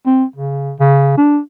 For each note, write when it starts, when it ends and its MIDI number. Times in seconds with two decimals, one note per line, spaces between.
0.06 0.24 60
0.36 0.73 49
0.80 1.14 49
1.17 1.39 62